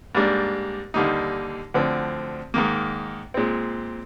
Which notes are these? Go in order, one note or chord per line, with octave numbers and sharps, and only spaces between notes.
G#2 G3 A#3 D4
D#2 D3 G3 A#3 D#4
D2 D3 F3 C4
G#2 D#3 A#3
A#2 G#3 C4